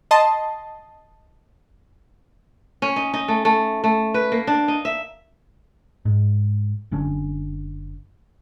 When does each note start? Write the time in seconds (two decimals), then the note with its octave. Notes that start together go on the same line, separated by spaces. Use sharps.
0.11 D#5 A5 C6
2.82 C#4
2.96 D#4
3.14 D#4
3.28 A3
3.45 A3
3.84 A3
4.14 B4
4.32 A#3
4.47 D4
4.68 D#4
4.85 E5
6.05 G#2
6.91 F#1 D3 C#4 D4